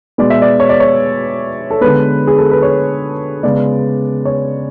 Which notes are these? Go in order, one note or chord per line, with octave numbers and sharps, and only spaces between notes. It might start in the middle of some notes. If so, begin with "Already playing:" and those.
B2 G#3 B3 D5
E5
D5
C#5
D5
C#5
A4
D3 G#3 B3 B4
G#4
A4
B4
C#5
C#3 G#3 B3 D5
C#5